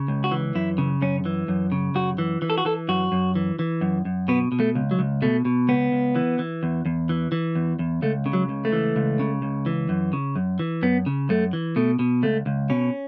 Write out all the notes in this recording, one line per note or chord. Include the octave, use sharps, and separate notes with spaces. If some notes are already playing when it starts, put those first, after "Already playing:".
Already playing: C#3
C#2
F#4
E3
F#2 E4
C#3
F#2 C#4
E3
F#2
C#3
F#2 F#4
E3
E3
A4
F#4
E3 A4
F#2 F#4
F#2
E3
E3
F#2
F#2
B2 B3
B2
A3
C#2
F#3
C#2
B2 A3
B2
C#2 B3
C#2
E3
E3
E2
E2
E3
E3
E2
E2
C#2 A3
C#3
F#3
C#2
A3
E3
C#2
C#3
C#2
E3
F#2
C#3
F#2
E3
F#2 B3
C#3
F#2 A3
E3
B2 A3
B2
C#2 A3
C#2
B2 C#4